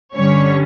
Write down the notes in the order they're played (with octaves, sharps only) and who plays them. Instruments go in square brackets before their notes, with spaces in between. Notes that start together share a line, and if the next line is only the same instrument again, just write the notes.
[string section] G2 D3 G3 C#4 C#5